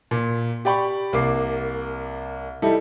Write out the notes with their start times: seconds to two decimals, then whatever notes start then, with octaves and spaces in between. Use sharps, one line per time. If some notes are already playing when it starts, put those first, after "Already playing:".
0.11 A#2
0.65 G4 D5 G5 B5 C#6
1.13 C2 A#3 D6 C7
2.62 G3 D#4 E4 G4 A4